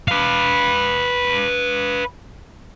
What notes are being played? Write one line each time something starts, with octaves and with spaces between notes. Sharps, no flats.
B4 F5